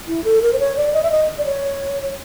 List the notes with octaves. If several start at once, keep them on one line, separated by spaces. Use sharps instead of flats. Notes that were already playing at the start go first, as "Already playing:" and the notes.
E4
A4
A#4
C5
C#5
D5
D#5
E5
D#5
D5
C#5